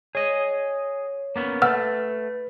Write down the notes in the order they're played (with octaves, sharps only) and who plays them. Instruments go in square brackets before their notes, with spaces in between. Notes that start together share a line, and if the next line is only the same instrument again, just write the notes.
[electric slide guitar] G#4 D#5 [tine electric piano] C#5
[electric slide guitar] A#3 B3 C#4
[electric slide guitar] A3 [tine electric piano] B4 [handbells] F#5 E6 F6